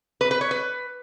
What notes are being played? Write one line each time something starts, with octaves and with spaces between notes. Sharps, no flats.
B4
B4
C#5
B4